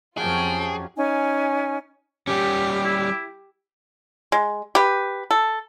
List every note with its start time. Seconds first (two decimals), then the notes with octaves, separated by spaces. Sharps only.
0.17 F2 F#3 C#4 F4 G4 G#4 G5 A5
0.96 C#4 D#4 G#5
2.27 G3 C#4 G4
2.85 E4
4.32 G#3
4.75 G4 B4
5.31 A4